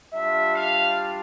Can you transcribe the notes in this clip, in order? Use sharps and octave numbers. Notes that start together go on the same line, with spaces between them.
G3 D4 F4 E5
F5